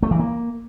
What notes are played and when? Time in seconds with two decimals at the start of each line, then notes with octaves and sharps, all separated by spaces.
0.03 A3
0.11 E3
0.20 A#3